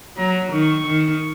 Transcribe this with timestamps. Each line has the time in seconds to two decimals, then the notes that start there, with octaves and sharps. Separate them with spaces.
0.17 F#3 A#5
0.52 D#3 C#6
0.87 D#3